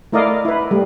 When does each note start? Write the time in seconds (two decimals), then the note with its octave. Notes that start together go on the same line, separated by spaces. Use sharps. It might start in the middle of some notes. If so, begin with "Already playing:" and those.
0.12 A3 E4 A#4 D5 D#5 F5
0.45 E4 B4
0.71 G3 A3